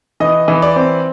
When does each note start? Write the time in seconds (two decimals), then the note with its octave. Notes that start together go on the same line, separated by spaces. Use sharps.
0.20 E3 D#5
0.48 E3
0.62 D5
0.76 C4